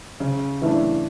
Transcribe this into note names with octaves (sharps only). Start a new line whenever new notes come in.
C#3
E3 A3 D4